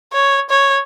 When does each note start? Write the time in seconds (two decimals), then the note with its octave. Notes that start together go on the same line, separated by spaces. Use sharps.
0.13 C#5
0.50 C#5